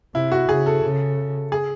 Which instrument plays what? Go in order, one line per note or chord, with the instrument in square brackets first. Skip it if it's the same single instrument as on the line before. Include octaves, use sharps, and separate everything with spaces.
[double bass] C3 [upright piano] E4
[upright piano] F#4
[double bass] C#3 [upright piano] G#4
[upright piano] A4
[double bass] C#3
[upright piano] G#4